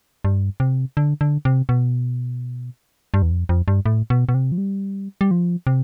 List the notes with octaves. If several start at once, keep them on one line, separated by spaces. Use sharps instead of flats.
G2
C3
D3
D3
C3
B2
G2
E2
F2
F2
G2
A2
B2
B2
C3
F3
G3
G3
F3
C3